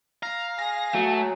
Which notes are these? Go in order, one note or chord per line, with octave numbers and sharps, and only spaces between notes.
F5 A#5
G#4 A#6
F#3 A3